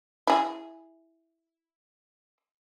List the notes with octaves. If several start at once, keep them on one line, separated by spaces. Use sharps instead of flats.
E4 G#4